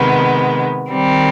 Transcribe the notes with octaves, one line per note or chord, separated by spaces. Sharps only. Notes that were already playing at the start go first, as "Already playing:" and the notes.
Already playing: C3 D#3 G#3 B3
D#3 G3 C4